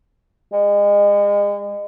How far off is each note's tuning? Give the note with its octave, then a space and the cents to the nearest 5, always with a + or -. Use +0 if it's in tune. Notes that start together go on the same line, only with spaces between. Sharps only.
G#3 -35